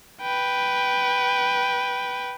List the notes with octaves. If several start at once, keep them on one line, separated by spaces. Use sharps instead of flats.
B4 G5